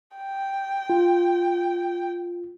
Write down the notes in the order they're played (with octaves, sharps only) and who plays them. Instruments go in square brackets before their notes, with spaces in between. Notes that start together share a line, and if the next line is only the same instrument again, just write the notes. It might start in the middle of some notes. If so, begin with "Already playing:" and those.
[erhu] G5
[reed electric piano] F4